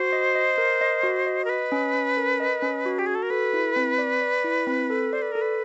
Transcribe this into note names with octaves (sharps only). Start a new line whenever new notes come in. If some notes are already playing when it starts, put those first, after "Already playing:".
Already playing: F#4 C5
D#5
D#5
A#4
D#5
F#4
D#5
A#4
B4 D#5
C#4
C#4
A#4
D#5
C#4
F#4
G4
F#4 G#4
A4
A#4
A4 B4
E4
C4
D5
D5
E4
C4
A4
C5 D5
B4
A4 A#4
B4